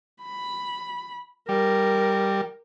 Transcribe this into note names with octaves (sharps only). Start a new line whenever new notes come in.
B5
G3 A#4